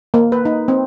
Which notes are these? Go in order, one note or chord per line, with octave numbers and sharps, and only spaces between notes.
A#3
B4
D#4
C4